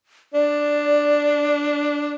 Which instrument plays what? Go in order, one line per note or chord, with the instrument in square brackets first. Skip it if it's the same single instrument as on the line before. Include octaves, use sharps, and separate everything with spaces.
[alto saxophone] D4 [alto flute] D5